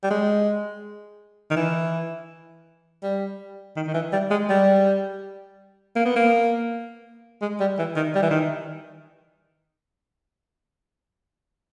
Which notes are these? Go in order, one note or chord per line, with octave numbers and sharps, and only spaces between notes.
G3
G#3
D#3
E3
G3
D#3
D#3
E3
G3
G#3
G3
A#3
B3
A#3
G#3
G3
E3
D#3
G3
E3
D#3